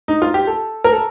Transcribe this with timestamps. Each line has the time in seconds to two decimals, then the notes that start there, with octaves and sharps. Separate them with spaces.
0.08 D#4
0.22 F4
0.34 G4
0.47 A4
0.84 A#4
0.93 A4